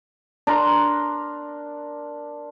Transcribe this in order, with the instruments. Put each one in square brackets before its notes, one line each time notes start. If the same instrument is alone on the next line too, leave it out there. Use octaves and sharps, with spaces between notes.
[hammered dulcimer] D4 A#4 A#5 C6